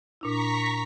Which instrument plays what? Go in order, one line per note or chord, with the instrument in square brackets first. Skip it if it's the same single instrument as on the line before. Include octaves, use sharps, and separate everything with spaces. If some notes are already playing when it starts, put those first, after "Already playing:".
[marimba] A#2 D4 E4 [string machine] A#5 C#6 B6